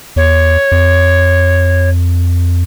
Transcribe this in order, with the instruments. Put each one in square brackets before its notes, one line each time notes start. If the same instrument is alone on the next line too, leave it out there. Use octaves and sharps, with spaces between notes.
[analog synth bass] E2 [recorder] C#5
[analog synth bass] F2